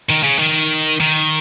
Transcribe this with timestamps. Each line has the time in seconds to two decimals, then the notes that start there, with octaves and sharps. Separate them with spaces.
0.10 D#3
0.24 C#3
0.38 D#3
1.00 D#3